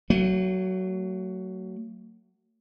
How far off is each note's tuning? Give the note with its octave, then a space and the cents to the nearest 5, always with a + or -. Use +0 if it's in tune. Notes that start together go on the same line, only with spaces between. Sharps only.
F#3 +15 A3 +45